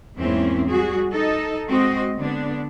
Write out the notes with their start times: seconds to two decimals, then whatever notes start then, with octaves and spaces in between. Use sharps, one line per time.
0.18 E2 G#2 A#3 C4 C#4 E4
0.69 G3 F#4 G#4
1.12 D#4 A4 D#5
1.68 G#3 C4 F#4 D#5
2.17 D3 B3 D4